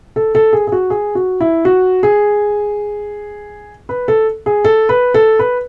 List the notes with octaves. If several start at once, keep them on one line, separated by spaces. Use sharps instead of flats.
A4
A4
G#4
G#4
F#4
G#4
F#4
E4
F#4
G#4
B4
A4
G#4
A4
B4
A4
B4